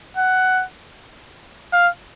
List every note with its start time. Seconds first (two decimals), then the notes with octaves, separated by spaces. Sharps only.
0.17 F#5
1.73 F5